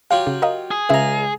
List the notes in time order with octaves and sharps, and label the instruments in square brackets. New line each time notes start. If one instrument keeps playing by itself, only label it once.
[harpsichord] F#3 F4 G4 [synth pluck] F5
[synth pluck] C#3
A#4 D#5 F5
[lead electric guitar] G#4
[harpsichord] C#2 A#5 [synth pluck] C#3 E5 E6